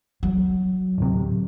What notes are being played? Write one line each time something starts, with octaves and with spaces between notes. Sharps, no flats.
F#3
D1 C3